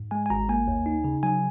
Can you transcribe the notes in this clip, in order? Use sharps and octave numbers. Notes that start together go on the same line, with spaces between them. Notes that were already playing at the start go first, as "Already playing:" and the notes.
Already playing: G#2
G#3 G#5
G#5
G#1 A#5
A#3 G#5
D#2
D#4
C#3
F#3 G#5